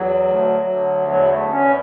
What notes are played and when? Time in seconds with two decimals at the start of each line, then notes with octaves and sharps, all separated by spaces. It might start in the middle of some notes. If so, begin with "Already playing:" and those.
Already playing: E2 F#3
0.25 D2
0.66 D2
1.08 E2 F#3
1.29 A3
1.49 E2 C#4